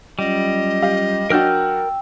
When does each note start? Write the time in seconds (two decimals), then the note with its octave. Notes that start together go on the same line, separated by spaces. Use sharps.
0.19 F#3 G3 C#4 F4 D#5
0.82 G4 F5
1.30 F#3 D4 F#4 A#4 G5 E6 F6 G6